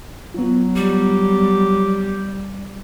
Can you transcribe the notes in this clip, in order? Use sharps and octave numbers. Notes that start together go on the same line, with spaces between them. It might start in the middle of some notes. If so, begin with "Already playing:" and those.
F#3 B3 F4
G3 G4